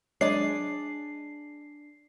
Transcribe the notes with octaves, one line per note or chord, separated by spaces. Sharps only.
F#3 G#3 D4 G#4 D5 C7